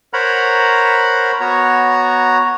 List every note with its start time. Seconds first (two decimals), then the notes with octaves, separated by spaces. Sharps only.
0.13 A#4 C5 C#5 F#5 A#5 B5
1.41 B3 F#4 C#5 A#5